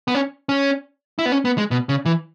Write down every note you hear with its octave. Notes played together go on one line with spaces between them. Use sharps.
B3
C#4
C#4
E4
B3
C#4
B3
G#3
B2
C#3
E3